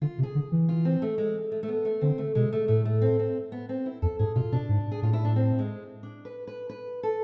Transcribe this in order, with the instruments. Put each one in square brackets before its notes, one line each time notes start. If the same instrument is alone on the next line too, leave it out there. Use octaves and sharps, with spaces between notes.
[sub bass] D3 [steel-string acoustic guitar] F4
[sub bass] C3
[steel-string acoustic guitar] G#4
[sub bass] D3
E3
[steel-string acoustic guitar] F4
C4
A3
G#3
A3
A3
B3
A3
[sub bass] D3 [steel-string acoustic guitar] C4
[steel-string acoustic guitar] A3
[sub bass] B2 [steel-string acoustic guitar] G#3
[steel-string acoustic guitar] A3
[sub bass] A2 [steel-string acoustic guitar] A3
[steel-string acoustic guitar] A3
C4
C4
B3
C4
E4
[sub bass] F2 [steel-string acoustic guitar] A4
[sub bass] G#2 [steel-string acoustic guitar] G#4
[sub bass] B2 [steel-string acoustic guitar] F4
[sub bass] B2 [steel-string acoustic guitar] D4
[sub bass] G#2
[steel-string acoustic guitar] G#4
[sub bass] A2 [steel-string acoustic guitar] F4
[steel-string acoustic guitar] E4
D4
C4
G#3
D4
B4
B4
B4
A4